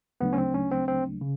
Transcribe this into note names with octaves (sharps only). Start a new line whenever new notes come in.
D2 C#3 F#3 A3 B3 D4
C#4
C4
C#4
C4
C4
C#3